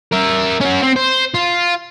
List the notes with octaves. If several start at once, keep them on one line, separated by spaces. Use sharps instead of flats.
A#4 E5
C#4 F#4
C4
C5
F4